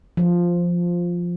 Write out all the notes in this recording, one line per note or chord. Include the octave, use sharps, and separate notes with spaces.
F3